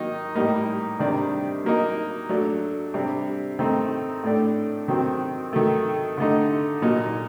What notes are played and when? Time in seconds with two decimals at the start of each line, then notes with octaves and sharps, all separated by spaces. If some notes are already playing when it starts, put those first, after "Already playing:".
Already playing: D#3 F#3 A#3 D#4
0.35 A2 G3 A#3 D#4
0.99 C3 D#3 G3 D4
1.64 F#3 A#3 D#4
2.29 F#3 A3 D4
2.94 C3 G3 D4
3.59 D#3 A3 C4 D#4
4.23 A2 A3 D4
4.88 D#3 F#3 C4
5.53 D#3 F#3 A3
6.18 D3 A3 D#4
6.82 A#2 F#3 A#3 D#4